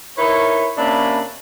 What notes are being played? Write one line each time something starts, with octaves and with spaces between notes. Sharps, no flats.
D#4 E4 A#4 B4 C#5
C3 A#3 C#4 D4 E4 B5